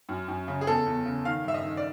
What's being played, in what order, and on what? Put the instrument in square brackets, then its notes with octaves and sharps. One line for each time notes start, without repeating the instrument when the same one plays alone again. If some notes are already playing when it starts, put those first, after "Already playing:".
[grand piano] F#2
F#2
C#3
G#4
E2 A4
E2
C#3
D#3 F5
G2 E5
D#5
D#3
D5